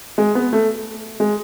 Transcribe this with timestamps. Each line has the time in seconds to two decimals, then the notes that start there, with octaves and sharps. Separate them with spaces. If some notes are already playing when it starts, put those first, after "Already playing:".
0.18 G#3
0.35 B3
0.53 A3
1.20 G#3